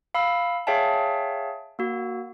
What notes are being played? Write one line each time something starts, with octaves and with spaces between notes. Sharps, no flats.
F5 B5 E6
G#4 C#5 E5 F5 G5 A5
A#3 F#4